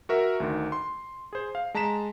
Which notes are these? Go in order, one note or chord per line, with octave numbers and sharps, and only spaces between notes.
F#4 A#4 E5
D2 D3 D#3
C6
G#4 C5
F5
G#3 A5 A#5 B6 E7